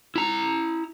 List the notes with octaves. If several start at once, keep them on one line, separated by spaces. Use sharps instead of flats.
E4 A#5